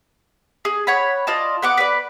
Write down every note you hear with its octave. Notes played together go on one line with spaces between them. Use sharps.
G#4
C#5 F#5 B5
F4 D5 D#5 A5
B3 F#5 D6
B4 D5